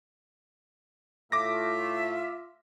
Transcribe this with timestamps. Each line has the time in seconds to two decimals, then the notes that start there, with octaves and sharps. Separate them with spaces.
1.32 A2 A3 F4 E5 D6 A#6